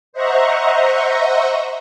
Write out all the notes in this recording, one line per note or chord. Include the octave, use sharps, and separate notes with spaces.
C5 D#5 E5 F#5 A#5 C#6